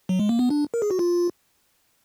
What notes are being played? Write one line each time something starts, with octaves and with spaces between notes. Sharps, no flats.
F#3
G#3
A#3
B3
D4
A#4
G#4
F#4
F4